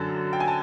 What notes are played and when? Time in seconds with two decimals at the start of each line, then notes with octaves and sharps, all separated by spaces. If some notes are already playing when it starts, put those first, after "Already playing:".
Already playing: F#2 D3 F#3 A4
0.33 G5
0.40 G#5
0.48 A5